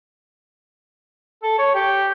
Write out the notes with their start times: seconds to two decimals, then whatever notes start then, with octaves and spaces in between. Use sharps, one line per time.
1.43 A4
1.58 C#5
1.74 G4